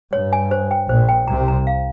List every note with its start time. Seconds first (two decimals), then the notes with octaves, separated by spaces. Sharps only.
0.13 G2 C#5
0.33 G#5
0.51 C5
0.71 G5
0.89 A#1 A#2 C5
1.09 G5
1.28 C2 C3 A#5
1.48 A#5
1.67 F5